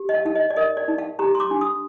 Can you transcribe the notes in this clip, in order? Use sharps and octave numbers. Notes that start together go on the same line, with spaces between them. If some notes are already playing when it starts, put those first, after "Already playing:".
Already playing: G4
D#5
F5
D#4 F5
D#5
D5
A#4 D#5
D5
D#4
F5
G4 A#5
C6
D6
D4
D#6